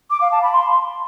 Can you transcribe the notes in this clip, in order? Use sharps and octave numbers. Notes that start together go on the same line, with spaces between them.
D6
F5
A5
B5
C6